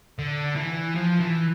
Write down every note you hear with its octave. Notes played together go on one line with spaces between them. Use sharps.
D3
E3
F3
E3